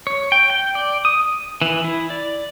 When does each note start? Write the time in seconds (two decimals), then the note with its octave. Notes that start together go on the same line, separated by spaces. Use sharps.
0.07 C#5
0.32 G5
0.50 G5
0.75 D5
1.05 D#6
1.62 E3
1.84 E4
2.10 D5